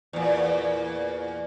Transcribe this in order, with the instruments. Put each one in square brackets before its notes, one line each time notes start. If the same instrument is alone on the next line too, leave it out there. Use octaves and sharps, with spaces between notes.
[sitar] E2 A#2